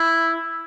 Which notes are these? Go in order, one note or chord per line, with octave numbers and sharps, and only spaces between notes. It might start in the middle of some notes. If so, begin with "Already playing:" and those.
Already playing: E4